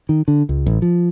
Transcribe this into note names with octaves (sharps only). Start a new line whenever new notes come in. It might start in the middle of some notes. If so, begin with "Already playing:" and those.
D#3
D3
C#2
A1
F3